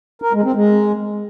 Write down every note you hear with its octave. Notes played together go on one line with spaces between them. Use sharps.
A#4
G#3
C4
G#3